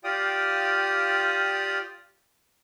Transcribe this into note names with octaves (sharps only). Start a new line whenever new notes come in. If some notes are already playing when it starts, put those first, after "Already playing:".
F4 G4 D5 F5 G5 D#6